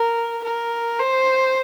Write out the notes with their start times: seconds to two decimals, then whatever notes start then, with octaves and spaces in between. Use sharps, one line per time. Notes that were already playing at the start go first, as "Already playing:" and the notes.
Already playing: A#4
0.44 A#4
0.99 C5